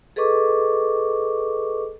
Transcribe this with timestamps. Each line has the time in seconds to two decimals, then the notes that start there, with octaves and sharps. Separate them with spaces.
0.16 G#4 A4 B4 D#5 C#6 D6